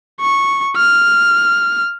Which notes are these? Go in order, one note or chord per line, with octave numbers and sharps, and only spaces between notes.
C#6
F6